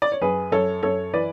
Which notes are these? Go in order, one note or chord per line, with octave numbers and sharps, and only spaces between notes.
D5
C#5
F#2 G#4 B4
F#2 A4 C#5
F#2 A4 C#5
E3 B4 D5